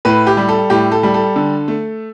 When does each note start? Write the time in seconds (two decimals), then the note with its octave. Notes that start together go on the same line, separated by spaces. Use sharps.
0.05 A2 B4
0.27 G4
0.37 G3
0.49 A4
0.70 A2 G4
0.92 A4
1.03 G3
1.14 A4
1.36 D3
1.68 A3